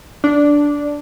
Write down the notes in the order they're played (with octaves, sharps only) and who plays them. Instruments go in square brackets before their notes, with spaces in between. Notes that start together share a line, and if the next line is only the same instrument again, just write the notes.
[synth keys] D4